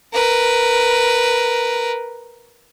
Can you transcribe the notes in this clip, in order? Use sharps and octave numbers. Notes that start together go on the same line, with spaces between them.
A#4 B4